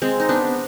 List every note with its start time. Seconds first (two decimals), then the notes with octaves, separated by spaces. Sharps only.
0.02 G#3 C4
0.20 D#4
0.29 B3 D4